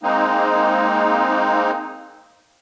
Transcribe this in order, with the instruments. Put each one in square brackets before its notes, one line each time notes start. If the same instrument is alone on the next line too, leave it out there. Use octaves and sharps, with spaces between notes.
[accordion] G#3 A#3 C4 D#4